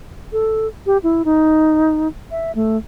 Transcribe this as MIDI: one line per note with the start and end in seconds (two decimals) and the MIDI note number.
0.32 0.67 69
0.86 0.98 67
1.03 1.22 64
1.25 2.08 63
2.31 2.52 76
2.55 2.77 57